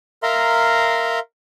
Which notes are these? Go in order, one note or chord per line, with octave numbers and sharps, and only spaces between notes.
A#4 E5 F5 A#5 C6